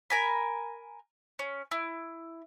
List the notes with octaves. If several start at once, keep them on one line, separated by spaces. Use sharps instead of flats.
A#4 G#5 B5
C#4
E4